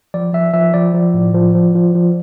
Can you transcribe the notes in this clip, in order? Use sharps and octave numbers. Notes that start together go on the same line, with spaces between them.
F3 D5
F3 E5
F3 E5
F3 D5
F3
A2
F3
F3
F3
F3